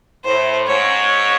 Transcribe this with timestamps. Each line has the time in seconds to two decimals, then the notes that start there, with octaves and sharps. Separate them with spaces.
0.25 A2 C5
0.67 G#2 C#5